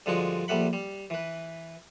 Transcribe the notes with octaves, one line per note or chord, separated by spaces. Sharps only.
G2 D3 F3 G#3 F#4 C#6
A#1 G3 A3 F#5 B5
G3
E3 B4